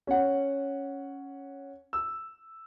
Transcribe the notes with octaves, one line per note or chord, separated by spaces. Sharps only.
C#4 F#5
E6